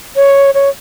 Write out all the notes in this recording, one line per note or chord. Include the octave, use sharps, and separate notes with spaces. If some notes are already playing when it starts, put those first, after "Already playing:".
C#5
C#5